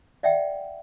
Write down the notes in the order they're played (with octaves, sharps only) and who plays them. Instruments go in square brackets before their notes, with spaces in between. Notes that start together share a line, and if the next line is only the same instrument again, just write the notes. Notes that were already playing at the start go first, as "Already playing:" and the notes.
[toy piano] D5 E5 F#5 G5